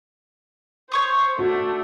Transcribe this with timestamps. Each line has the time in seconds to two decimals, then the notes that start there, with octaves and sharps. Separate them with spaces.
0.92 C5 C#5 C#6 D#6
1.39 A3 D4 F#4